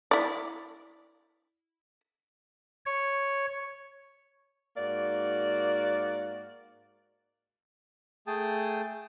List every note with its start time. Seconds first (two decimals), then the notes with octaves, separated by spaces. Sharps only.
0.11 E4 D5
2.86 C#5
4.76 G#2 A#3 F#4 D5
8.27 A3 G#4 G5 A5 D#6